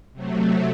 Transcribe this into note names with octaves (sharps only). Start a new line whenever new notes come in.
C3 F#3 A3